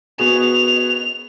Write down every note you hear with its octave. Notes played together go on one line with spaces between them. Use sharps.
B3 F#4 G#4 F7